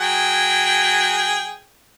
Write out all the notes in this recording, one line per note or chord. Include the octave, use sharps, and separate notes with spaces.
F#3 G#4 G5